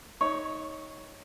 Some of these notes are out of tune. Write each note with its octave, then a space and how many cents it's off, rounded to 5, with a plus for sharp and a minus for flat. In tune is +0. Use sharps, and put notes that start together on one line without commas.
D#4 +15 C#5 +0